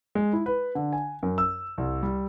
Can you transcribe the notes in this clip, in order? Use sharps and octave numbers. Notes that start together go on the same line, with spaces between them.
G#3
E4
B4
D3
G#5
F#2
E6
C2
G3